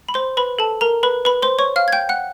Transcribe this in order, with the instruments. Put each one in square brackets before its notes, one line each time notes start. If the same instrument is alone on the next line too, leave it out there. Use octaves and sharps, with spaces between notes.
[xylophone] B5
C5 C6
B4 B5
A4 A5
A#4 A#5
B4 B5
B4 B5
C5 C6
C#5 C#6
F5 F6
G#6
G5 G6
F#5 F#6